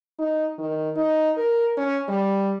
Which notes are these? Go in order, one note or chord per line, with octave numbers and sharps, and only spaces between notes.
D#4
D#3
D#4
A#4
C#4
G3